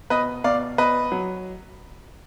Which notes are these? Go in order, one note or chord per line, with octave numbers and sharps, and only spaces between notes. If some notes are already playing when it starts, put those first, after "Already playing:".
B2 B4 D#5
B2 D5 F5
B2 B4 D#5
F#3